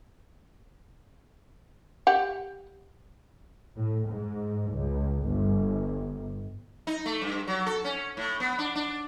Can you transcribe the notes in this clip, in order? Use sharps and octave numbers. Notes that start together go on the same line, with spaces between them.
G4 F#5
A2
G#2
C#2
G1
D#4
A3
G2
F#3
A4
C#4
A2
B3
D4
D4